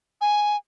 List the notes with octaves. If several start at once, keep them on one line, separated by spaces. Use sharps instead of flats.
G#5